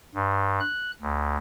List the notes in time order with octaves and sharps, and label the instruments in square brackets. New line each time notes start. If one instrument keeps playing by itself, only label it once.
[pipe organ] G2
F#6
D2